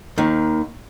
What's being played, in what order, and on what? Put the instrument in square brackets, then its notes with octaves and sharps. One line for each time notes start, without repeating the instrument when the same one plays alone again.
[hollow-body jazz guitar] D#2 D#3